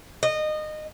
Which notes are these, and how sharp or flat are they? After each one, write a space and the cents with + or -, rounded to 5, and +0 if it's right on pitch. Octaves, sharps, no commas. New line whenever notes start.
D#5 -20